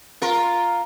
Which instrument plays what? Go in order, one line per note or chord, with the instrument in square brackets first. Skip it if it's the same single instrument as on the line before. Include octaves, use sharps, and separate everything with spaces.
[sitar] F4 A#4